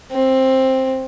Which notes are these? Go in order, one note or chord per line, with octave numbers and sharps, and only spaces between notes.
C4